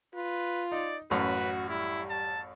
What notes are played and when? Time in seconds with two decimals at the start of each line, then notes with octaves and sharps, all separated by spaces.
0.15 F4 B4
0.72 D#4 D5
1.11 A1 F#2 A2 F#4 B4
1.69 G3 E4
2.10 A5